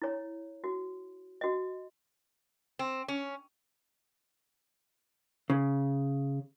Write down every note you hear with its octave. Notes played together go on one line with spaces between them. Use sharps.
E4 C#5
F#4
F#4 D#5
C4
C#4
C#3